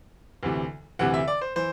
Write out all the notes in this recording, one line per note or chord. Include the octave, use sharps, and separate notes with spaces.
D2 C3 E3
D2 C3 E3 F#5
E5
D5
C5
E3 C5